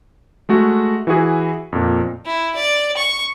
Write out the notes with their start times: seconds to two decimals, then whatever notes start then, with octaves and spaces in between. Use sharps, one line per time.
0.49 G#3 A3 F#4
1.07 E3 E4 F#4 G#4 B4
1.72 F2 A#2
2.26 E4
2.56 D5
2.97 C#6